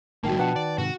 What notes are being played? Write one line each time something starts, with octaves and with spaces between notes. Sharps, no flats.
A#1 G#2 D#3 G3 A#3 F#4 G5 A5
B2 F3 D4 B4 F#5 G5 A5
D#3 D5
G#2 C3 D#3 F#4